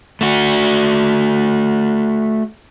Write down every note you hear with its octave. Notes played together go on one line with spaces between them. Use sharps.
A3 F#4